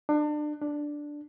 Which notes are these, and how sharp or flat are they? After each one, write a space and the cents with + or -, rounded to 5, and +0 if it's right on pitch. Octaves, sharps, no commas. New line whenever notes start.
D4 +30
D4 +0